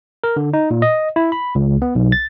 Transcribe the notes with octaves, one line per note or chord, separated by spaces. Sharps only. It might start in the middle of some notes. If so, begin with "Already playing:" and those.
A#4
D3
D#4
A#2
D#5
E4
B5
C#2
B3
B1
A6